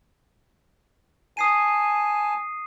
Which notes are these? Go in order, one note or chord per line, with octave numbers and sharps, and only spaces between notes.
G#5 A5 D#6 C7 D#7